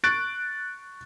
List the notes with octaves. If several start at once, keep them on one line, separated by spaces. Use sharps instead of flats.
C#6 F#6 A6 D7